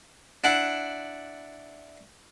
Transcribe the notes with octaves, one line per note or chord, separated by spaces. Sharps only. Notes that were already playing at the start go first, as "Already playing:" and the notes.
D4 E4 F#5